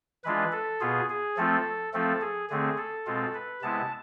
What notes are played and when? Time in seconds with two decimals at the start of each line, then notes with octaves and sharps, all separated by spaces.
0.24 E3 G#3 D4 F4 B4
0.52 A4
0.80 B2 B3 F4 G#4
1.10 G#4
1.37 F3 A3 C4 F4 A4
1.93 F3 A3 C4 F4 A4
2.21 G#4
2.50 D3 A3 C4 G#4
2.78 A4
3.06 B2 G#3 C4 F4
3.34 B4
3.62 C3 G#3 B3 E4 A5